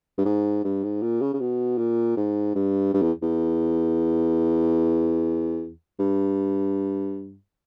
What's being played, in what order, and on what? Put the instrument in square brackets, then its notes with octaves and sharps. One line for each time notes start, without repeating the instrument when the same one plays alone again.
[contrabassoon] G2
G#2
G2
G#2
A#2
C#3
C#3
B2
A#2
G#2
G2
G2
E2
E2
G2